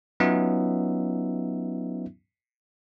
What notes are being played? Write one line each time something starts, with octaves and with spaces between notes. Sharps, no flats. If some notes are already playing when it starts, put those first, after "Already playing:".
F#3 B3 C#4 D#4 F4 E5